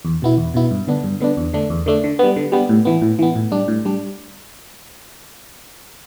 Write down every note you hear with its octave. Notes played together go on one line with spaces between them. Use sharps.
E2
B2 B3 E4
E2
B2 B3 E4
G2
D3 B3 D4
G2
D3 B3 D4
E2
D3 A3 D4
E2
D3 A3 D4
D3
G3 B3
D3
G3 B3
A2
E3 B3
A2
E3 B3
A2
G3 D4
A2
G3 D4